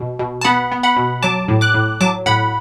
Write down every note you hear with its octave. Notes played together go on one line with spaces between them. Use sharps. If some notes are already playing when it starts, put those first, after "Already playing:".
Already playing: B2
B2
A5
B3 F#5 B5
B3
F#5 B5
B2
F#3 A5 D6
A2
D6 F#6
A2
F#3 A5 D6
A2 F#5 B5